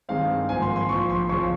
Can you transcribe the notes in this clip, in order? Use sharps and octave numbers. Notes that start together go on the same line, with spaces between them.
G2 D#3 G#3 C4 F5
G#1 G#2 F3 A#3 G#5
C6
C6
A#1 A#2 F3 C#6
C6
F2 C#3 F3 C#6